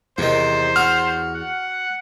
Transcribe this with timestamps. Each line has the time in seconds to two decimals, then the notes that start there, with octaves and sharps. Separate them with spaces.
0.18 E2 C3 D#3 C5
0.76 F#4 F6
1.34 F#5